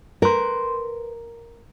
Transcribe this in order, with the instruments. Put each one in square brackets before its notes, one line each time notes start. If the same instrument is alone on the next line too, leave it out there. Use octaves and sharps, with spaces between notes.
[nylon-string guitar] A#4 [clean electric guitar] B4 C6